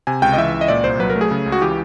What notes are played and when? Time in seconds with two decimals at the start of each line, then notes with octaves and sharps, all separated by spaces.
0.07 C3 G#5
0.22 C#2 G5
0.33 D#5
0.37 E3 E5
0.54 C#2
0.61 D#5
0.68 A#2 D5
0.84 C2 C5
0.99 F#3 B4
1.10 A#4
1.16 A3
1.21 G#4
1.31 C#3
1.46 C#2
1.52 F#4
1.61 E3 G4